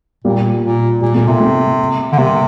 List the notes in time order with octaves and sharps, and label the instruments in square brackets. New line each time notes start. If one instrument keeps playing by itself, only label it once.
[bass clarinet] A#2 [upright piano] G3 A#3
[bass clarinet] A#2
[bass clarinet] A#2 [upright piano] G3
[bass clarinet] A#2 [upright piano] A3
[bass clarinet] C3 [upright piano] A#3
[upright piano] A3 C4
[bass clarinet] D3
[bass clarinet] C3 [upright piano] G3 A#3